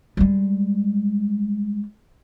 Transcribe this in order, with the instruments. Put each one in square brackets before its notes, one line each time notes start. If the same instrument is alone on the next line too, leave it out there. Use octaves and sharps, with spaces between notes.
[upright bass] G3 G#3